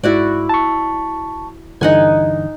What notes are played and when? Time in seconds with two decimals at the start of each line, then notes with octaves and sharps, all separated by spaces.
0.04 G#2 E4 F#4 D5
0.49 A5 C#6
1.81 G2 D3 E3 D#4 F#5 G#5